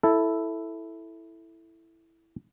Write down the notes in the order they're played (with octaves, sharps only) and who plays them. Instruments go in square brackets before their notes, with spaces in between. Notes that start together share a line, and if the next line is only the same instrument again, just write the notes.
[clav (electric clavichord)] E4 A4